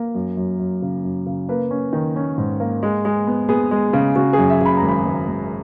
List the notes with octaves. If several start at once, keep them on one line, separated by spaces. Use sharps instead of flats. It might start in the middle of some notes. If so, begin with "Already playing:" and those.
Already playing: A#3
F#2
F#2
F#2
C#3
F#2
C#3
A#3 B4
C#4
D#3
C#4
G#2
A#3
G#3
G#3
B3
B3 G#4
G#3
C#3
C#3 F#4
F#2 G#4
E5
C#3 B5
A#5
G#1
B5
G#1
G#1